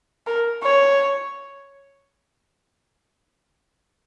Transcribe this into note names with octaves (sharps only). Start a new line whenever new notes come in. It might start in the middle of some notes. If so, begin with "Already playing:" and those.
A#4
C#5